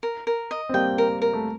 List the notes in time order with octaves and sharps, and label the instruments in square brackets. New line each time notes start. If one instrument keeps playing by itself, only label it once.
[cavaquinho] A#4
A#4
D#5
[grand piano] C4
[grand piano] G3 A#3 [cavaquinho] G5
[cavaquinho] A#4
A#4
[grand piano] A3